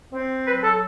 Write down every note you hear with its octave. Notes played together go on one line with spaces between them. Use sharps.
C4
F#3 B4
A4